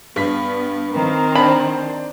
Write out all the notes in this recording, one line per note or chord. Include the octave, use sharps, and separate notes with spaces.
G2 B3 B6
D#3 C4 A#4
D4 C5 B5